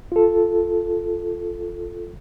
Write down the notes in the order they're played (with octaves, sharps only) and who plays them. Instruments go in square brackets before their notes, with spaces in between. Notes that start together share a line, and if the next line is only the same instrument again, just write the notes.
[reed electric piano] F4 A4